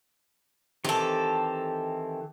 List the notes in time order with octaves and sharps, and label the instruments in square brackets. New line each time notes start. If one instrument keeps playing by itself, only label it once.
[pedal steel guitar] D#3 E3 C4 [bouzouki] G4 A4